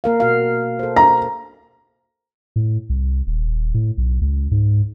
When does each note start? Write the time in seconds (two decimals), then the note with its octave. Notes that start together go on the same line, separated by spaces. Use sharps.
0.04 A#3 A#4 F5
0.20 B2 F#4 F5
0.79 A4 C5
0.96 A#5
2.56 A2
2.89 C2
3.27 D#1
3.74 A2
3.98 B1
4.21 C#2
4.51 G#2